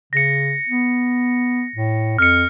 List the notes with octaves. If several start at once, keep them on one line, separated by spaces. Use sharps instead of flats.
C#3 A#6 C#7
B3
A2
F2 F6 C#7